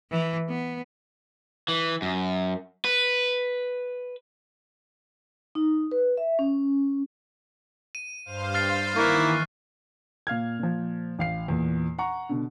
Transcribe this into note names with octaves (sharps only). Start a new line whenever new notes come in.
E3
B3
E3
F#2
B4
D#4
B4
E5
C#4
D#7
G2 C5 F5
F6 A6 C7
D#3 E3 A#3 E4 C#6 F#6
A#2 F5 F6 G#6
A#2 F3
A1 F5 C7
E2 A#2
F#5 A#5 C#6
B2 D3